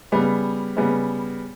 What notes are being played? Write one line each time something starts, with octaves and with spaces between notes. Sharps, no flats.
C#3 G3 B3
C#3 G3 B3